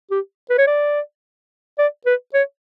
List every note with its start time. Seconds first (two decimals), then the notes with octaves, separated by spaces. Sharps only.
0.11 G4
0.50 B4
0.58 C#5
0.67 D5
1.78 D5
2.06 B4
2.34 C#5